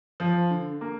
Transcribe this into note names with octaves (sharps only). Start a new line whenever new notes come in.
F3
D3
A#3